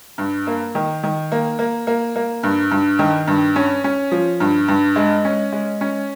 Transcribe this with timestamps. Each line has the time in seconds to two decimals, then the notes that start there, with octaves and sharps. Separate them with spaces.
0.18 G2
0.47 A#3
0.75 D#3
1.03 D#3
1.32 A#3
1.59 A#3
1.87 A#3
2.16 A#3
2.43 G2
2.71 G2
2.99 D#3
3.27 G2
3.56 C#4
3.84 C#4
4.11 F3
4.40 G2
4.68 G2
4.96 G#3
5.25 C#4
5.52 G#3
5.81 C#4